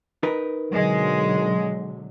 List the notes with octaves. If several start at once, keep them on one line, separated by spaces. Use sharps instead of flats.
D#4 A#4 B4
B2 D3 F#3 G#3